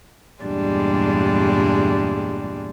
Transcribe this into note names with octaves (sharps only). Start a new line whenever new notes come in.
E2 G2 A#2 G3 G#3 D4